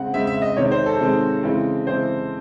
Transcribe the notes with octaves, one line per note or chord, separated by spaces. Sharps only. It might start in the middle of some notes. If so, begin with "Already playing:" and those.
Already playing: C#3 G#3 C4 F#5
C#3 G#3 C4 E5
E5
D#5
C3 D#3 G#3 C4 C#5
C5
A4
C3 D#3 G#3 C4
C#3 E3 G#3 C4
C#3 E3 G#3 C4 C5